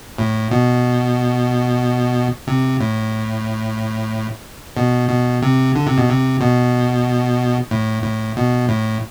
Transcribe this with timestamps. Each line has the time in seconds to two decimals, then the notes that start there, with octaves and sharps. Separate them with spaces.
0.18 A2
0.51 B2
2.47 C3
2.80 A2
4.77 B2
5.09 B2
5.42 C3
5.75 D3
5.86 C3
5.98 B2
6.09 C3
6.41 B2
7.71 A2
8.03 A2
8.37 B2
8.69 A2